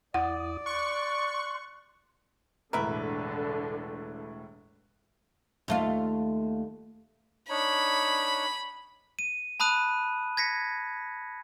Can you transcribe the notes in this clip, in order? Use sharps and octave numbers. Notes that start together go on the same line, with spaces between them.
E2 E4 D5 F#5 D#6
C6 C#6 F#6
E1 A2 D3 A#4 B4 E5
D#2 A3 F4
D4 D#4 C#5 B5
D#7
A5 B5 D#6 F#6 D#7
G#6 A#6 B6 C#7